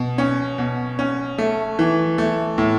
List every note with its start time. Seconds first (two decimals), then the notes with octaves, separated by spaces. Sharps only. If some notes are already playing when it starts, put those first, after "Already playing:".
Already playing: B2
0.18 C#4
0.58 B2
0.99 C#4
1.38 A3
1.79 E3
2.18 A3
2.58 A2